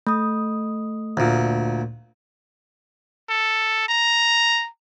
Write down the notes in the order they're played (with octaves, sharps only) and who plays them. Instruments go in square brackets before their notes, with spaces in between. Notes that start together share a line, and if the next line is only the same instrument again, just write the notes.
[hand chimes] A3 D#6
[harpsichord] D2 A#2
[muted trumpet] A4
A#5